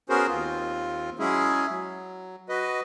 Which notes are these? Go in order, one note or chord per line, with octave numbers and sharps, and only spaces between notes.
B3 C#4 F#4 G#4 A#4 C5
D#2 C4 F4
F#3 G#3 C#4 E4 G#4
F#3
F#4 B4 D#5